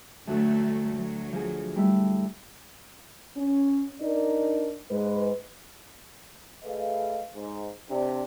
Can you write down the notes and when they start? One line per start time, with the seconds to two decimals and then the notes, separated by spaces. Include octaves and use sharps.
0.27 D2 F#3 A3 F#4
0.96 F#3
1.33 F3 G#4
1.76 G3 A3 E4
3.37 C#4
4.02 D4 D#4 A#4 D5
4.91 G#2 G#3 B4
6.64 A3 G#4 B4 D#5 F5
7.34 G#2
7.90 C3 D4